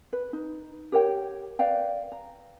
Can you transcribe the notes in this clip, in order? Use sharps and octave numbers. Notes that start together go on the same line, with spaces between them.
B4
D#4
G4 A#4 C#5 G5
B4 D5 F5 G5
A#5